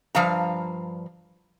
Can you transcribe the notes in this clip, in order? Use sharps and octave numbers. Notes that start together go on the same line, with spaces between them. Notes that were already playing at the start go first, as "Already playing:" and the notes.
G2 F3 F5 A#5